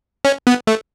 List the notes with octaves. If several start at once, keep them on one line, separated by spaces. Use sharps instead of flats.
C#4
B3
A3